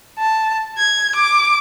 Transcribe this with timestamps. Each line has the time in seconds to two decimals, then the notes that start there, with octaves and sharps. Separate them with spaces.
0.19 A5
0.78 G#6
1.16 D6